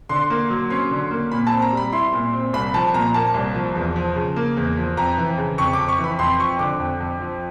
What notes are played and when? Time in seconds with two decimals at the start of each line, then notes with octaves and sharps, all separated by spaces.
0.09 D3 C6
0.30 A#3
0.50 F#3
0.70 C#4 C6
0.91 D3
1.11 A#3
1.32 A#2 B5
1.47 C4 A5
1.62 A#5
1.73 G3 B5
1.92 E4 C6
2.13 A#2
2.33 C4
2.53 C2 B5
2.74 F3 A5
2.93 A#2 A#5
3.14 A#3 A5
3.34 C2
3.55 F3
3.75 E2
3.96 F3
4.16 C#3
4.36 A#3
4.57 E2
4.77 F3
4.97 F2 A#5
5.18 E3
5.38 C#3
5.58 F2 C#6
5.73 D6
5.78 F2
5.88 C#6
5.99 E3
6.04 B5
6.19 F2 C6
6.39 F3 C#6
6.59 D3 D6
6.79 F2
7.00 F2
7.20 F3